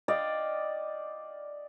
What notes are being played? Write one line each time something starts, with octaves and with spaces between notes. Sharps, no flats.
D5 D#5 F5 G5